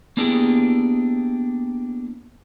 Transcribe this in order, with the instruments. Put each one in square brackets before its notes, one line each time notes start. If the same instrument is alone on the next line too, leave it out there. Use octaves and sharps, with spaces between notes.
[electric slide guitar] A#3 B3 D4 E4 G4 G#4